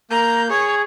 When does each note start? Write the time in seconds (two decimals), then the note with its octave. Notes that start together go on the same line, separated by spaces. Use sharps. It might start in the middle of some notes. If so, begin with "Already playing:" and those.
0.11 A#3 A#5 G6
0.50 G#4 C#5